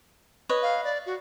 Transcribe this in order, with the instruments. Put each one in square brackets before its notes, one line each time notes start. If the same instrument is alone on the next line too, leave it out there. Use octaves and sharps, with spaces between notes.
[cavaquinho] B4 C#5 D#5
[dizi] F5
D5
F#4